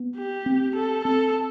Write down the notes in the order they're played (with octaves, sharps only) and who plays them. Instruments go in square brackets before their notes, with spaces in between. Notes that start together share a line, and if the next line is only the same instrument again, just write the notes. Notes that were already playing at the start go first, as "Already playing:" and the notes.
Already playing: [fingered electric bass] B3
[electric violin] G4
[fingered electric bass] C4
[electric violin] A4
[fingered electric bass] C4 [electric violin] A4